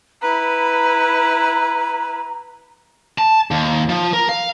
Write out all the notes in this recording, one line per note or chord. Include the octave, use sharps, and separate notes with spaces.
E4 B4 A#5
A5
D#2
F3
A#4
F5